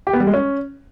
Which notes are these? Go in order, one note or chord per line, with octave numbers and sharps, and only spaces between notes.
G4
B3
G3
G#3
C#4